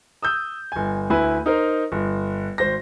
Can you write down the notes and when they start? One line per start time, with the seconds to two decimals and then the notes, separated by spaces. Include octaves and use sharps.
0.23 D#6 E6 G6
0.72 G1 G#5
1.10 D2 E4 B4 G#5
1.46 D#4 A#4 C5
1.92 G1
2.58 G#1 C5 A#6